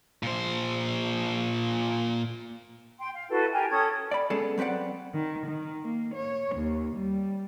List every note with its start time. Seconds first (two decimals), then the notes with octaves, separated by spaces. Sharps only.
0.23 A#2 C5
2.98 G5 C6
3.13 F5
3.30 E4 F#4 A4 B4
3.53 G4 A#4 G5 G#5
3.70 C#4 A4 D#6 G#6
4.11 D5 B5
4.30 G#3 B3 C#4 D4 G#4 A4
4.58 F#3 C4 B4 D5 F#5
5.14 D#3
5.47 D#3
5.83 A#3
6.15 C#5
6.56 D#2
6.97 G3